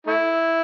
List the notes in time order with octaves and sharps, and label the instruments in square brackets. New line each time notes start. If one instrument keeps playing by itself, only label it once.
[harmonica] A3 E4